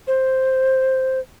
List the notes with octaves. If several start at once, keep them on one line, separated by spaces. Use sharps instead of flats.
C5